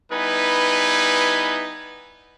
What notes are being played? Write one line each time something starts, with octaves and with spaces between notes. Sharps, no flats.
G3 B3 D#4 E4 B4 G#5